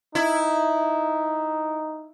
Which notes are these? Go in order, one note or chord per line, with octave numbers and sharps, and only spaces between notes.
D#4 E4